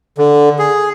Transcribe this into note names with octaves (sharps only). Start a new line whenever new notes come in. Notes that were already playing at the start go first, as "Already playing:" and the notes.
D3
G#4